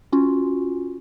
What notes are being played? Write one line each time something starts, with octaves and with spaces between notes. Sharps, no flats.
C#4 F4 F#4